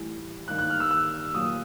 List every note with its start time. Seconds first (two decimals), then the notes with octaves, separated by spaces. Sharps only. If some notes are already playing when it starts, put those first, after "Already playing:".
Already playing: A2 E3 G3
0.48 G2 D#3 G3 A#3 F#6
0.59 F#6
0.70 F6
0.80 E6
0.91 E6
1.34 A#2 F#3 A#3 D#6